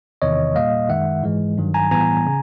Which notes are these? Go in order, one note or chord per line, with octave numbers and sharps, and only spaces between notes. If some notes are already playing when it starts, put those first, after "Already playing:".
E2 C3 D#3 C#5 D#5
A#2 G3 A#3 D#5 F5
F#2 D#3 G#3 E5 F#5
G#2 E3 G#3
G2 D#3 F#3
G#5 A#5
A2 E3 G3 B3 G#5 A#5
C#3